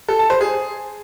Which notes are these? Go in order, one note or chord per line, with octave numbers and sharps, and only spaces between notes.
A4
A5
C5
G#4